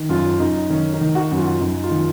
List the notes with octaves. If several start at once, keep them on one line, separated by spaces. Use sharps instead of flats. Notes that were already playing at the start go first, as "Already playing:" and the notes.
Already playing: D#3
F#2 F4
F#2 D#4
D#3 C#4
D#4
D#3
F#4
F#2
F4
F#2 D#4
F4
D#3